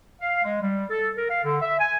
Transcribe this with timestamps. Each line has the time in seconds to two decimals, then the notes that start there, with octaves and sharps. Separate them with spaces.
0.21 F5
0.43 G#3
0.61 G3
0.90 A4
1.16 A#4
1.29 F5
1.44 D3
1.61 E5
1.79 G#5